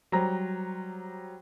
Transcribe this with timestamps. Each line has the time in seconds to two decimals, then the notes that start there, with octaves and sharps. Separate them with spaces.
0.12 F#3 G3 C5 A#5 A#6